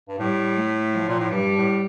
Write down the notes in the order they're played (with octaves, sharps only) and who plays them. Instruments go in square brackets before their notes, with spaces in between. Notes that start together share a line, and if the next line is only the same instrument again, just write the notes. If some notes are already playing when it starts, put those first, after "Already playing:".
[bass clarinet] G2
[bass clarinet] A2 [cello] G3
[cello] A3
F3
[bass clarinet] A#2
A2
[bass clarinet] G2 [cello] G3
[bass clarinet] A2